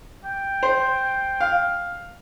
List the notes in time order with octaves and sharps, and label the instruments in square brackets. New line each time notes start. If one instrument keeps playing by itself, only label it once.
[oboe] G5
[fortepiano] C5
F5